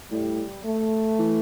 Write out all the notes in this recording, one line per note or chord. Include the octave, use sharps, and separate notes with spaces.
A2 G3
A3
E3